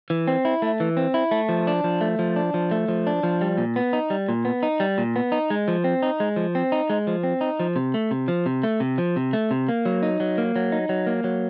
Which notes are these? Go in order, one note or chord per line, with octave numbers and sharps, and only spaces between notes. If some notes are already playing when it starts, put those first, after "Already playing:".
E3
C4
E4
A3
E3
C4
E4
A3
F3
D4
F3
A3
F3
D4
F3
A3
F3
D4
F3
G3
A#2
B3
D#4
G3
A#2
B3
D#4
G3
A#2
B3
D#4
G#3
F3
C4
D#4
G#3
F3
C4
D#4
G#3
F3
C4
D#4
F3
C3
A3
C3
F3
C3
A3
C3
F3
C3
A3
C3
A#3
F#3
D#4
F#3
A#3
F#3
D#4
F#3
A#3
F#3